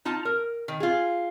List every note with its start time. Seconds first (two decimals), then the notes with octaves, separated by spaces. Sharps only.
0.05 D#4 F4 A5
0.25 A#4
0.68 D#3
0.80 F4 G#4